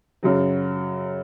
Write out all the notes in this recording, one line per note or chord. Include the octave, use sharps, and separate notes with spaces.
F#2 C#3 F#3